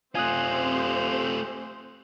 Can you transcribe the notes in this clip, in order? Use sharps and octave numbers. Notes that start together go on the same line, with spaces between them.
A3 C4 F4 G4 C5 G#5 D#6 F#6